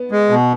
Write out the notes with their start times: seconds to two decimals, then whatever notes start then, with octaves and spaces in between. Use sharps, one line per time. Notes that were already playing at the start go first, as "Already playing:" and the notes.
Already playing: B3
0.12 G#3
0.29 B2